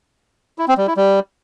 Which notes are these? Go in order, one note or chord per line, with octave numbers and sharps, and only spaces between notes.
E4
C4
G3
E4
G3